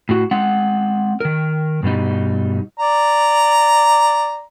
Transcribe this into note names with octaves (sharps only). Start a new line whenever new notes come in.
A2 F#4
G#3 C4 F#5
D#3 A#4
G2 B2 G3 D#4
D5 A#5